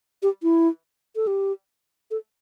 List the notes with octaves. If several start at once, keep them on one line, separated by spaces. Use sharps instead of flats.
G4
E4
A4
G4
A4